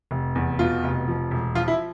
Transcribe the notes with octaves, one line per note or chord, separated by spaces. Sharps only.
F1
E2
B2 F4
F1
F3
E1
F3 F4
E4